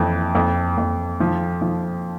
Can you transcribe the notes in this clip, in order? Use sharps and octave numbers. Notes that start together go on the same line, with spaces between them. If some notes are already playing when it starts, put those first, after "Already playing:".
Already playing: F2 E3
F2
F2
F3
F3